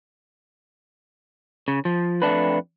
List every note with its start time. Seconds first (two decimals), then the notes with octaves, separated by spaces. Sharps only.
1.68 C#3
1.85 F3
2.22 F2 A3 D4 B4